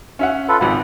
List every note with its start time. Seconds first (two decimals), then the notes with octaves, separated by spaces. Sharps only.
0.19 C#4 E5 F#5
0.48 F4 A4 B4
0.61 G#1 C#2 F#5 B5